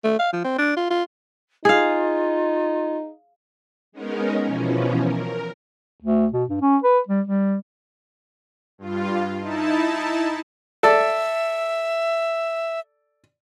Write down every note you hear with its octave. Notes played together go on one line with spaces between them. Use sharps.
A3
F5
F3
C4
D4
F4
F4
D#4 F4 G#4 F5
G#3 B3 C#4 D#4 A#4
B2 E3 F3 C#4
A#4
D2
B2
G2
C#4
B4
G3
G3
G2 F4
D#4 E4 A5
A4 D5 E5